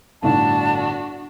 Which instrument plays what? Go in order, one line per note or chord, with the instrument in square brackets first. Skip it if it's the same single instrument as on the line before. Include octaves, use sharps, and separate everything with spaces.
[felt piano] G1 A2 D3 [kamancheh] D4 F#4 [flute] A5